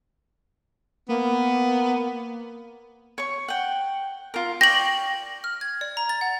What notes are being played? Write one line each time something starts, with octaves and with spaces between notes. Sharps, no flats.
A#3 B3
C#5 C#6
F#5 G5
F4 A#4
D5 G5 C#6 A#6 F#7
F6
G#6
D5
A#5
A6
F#5